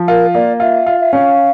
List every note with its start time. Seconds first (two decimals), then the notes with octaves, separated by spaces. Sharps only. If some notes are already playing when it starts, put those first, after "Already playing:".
Already playing: F3
0.08 F4 A#4
0.35 A#3 D5
0.60 F4 E5
0.86 F4
1.00 E5
1.13 C#4 F5